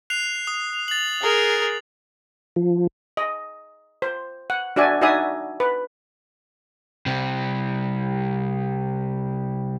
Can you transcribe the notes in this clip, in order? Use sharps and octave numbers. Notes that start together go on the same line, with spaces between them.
F#6 C7 F7
D#6
A6 F#7
G#4 A#4
F3
D#5
C5
F#5
D4 F#4 D5 E5 G#5
D#4 F#4 D5 E5 G#5 D#6
B4
C3 G3